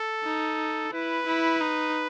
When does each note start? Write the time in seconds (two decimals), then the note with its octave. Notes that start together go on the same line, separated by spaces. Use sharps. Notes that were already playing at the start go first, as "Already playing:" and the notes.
Already playing: A4
0.24 D#4
0.92 E4 B4
1.27 E4
1.61 D#4